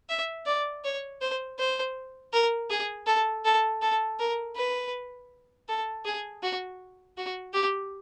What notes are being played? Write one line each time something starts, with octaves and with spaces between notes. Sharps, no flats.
E5
D5
C#5
C5
C5
A#4
G#4
A4
A4
A4
A#4
B4
A4
G#4
F#4
F#4
G4